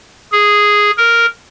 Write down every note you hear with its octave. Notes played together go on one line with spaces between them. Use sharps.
G#4
A#4